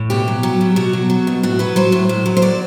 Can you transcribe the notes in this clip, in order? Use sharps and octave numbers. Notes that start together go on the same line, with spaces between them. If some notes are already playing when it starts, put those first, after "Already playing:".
Already playing: A2
B2 G4
F#3
F#3
B2
B2 F#4
F#3
F#3
B2
A2 F#4
F#3 B4
F#3 C5
A2
A2
F#3
C5
F#3 D5